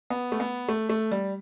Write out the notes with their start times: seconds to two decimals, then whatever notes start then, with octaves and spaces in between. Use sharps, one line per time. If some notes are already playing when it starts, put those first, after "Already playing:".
0.10 B3
0.32 A3
0.40 B3
0.69 A3
0.89 A3
1.11 G3